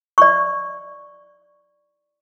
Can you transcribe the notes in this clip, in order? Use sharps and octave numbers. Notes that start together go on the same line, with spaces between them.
D5 C#6